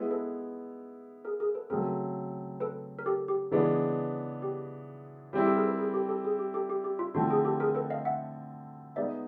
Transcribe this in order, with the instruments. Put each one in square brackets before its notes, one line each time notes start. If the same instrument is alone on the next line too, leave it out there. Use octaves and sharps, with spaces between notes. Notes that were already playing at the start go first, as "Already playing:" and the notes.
Already playing: [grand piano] G#3 B3 E4
[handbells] A4 B4
G#4 A#4
G#4 A#4
A4 B4
[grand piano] C#3 F#3 A3 C4 [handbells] G#4 A#4
[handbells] A4 B4
A#4
G4 A4
G4
[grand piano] C#3 E3 G#3 B3 D4
[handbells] G4
[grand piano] G3 C4 E4 [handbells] G#4
[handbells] G4 A4
G#4 A#4
A4 B4
G#4 A#4
G4 A4
G4 A4
G#4
G4
G4 A4
G4
G4
F4
[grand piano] D3 F3 A3 C4 E4 [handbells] F#4
[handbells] G#4
G4 A4
G#4 A#4
A4 B4
D#5 F5
E5 F#5
[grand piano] G#3 B3 D#4 G#4 [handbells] D5 E5